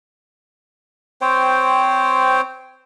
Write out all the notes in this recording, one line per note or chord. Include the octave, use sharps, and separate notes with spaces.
C4 C5 C#5 G5